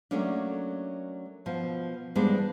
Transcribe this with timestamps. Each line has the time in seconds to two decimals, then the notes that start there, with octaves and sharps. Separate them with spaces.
0.11 F#3 A3 A#3 C#4 D4
1.46 B2 F3
2.15 E3 F3 G3 G#3 B3 D4